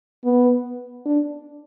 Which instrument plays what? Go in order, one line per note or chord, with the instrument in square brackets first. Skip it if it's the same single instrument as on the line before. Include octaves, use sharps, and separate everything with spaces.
[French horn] B3
D4